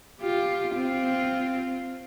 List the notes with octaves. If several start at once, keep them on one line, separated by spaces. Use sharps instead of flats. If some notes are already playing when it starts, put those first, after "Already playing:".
F4 G4
C4 F4